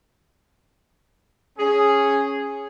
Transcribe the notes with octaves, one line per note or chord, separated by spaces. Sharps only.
C#4 G#4